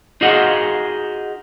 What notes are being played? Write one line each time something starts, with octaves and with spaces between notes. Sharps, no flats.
D#4 F4 F#4 G#4 D#5 F#5